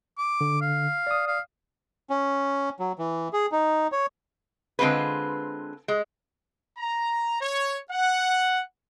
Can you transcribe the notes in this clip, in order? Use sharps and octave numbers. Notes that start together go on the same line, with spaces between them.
D6
D3
F5
D5 D#6
F5
C#4
F#3
E3
G#4
D#4
C#5
D3 G#3 C4 F4 B4
G#3
A#5
C#5
F#5